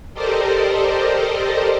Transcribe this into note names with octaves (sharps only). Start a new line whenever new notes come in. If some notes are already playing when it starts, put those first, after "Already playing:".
G4 A4 A#4 C5 D5 D#5